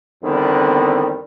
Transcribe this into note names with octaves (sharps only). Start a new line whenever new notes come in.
E2 D3 D#3 G3 B3 C4